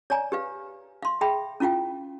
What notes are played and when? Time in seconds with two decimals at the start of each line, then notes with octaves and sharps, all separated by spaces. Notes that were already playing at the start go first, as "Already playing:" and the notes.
0.10 C#5 D5 G#5 A#5
0.32 G4 B4 F5
1.02 F5 C6
1.21 G#4 E5 G5 B5
1.60 C#4 E4 F4 F5 G5